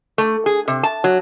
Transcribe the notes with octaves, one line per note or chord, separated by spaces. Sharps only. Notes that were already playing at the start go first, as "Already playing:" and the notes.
A3
G#4
C3
A5
F#3